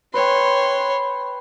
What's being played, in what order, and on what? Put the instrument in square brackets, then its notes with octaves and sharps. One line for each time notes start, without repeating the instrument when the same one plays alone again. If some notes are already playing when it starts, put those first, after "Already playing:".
[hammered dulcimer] B4 G5 [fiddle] C#5 C6